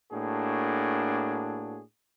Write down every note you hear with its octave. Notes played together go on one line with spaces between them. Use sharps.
A2 A#3 D4 F#4 G#4